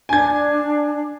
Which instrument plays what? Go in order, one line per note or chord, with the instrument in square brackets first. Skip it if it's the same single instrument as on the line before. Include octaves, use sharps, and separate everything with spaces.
[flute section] D4 [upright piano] G#5 G#6